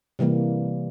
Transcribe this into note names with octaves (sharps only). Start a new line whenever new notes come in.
C3 E3 G3 A#3